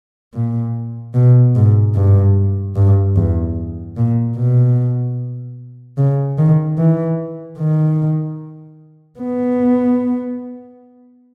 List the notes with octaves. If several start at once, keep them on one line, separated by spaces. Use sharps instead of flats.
A#2
B2
G#2
G2
G2
E2
A#2
B2
C#3
D#3
E3
D#3
B3